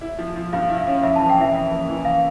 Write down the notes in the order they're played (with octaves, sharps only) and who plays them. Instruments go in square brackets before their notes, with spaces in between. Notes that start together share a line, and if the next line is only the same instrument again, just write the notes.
[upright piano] E4
F3
F3
[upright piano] G2 [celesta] F5
[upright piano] E4
[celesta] F5
[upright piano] C#4
[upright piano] F2 [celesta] E5
[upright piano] E3 [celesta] A5
[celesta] G5
[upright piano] E3 [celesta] E5
[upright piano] F2
A#3
E3
[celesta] F5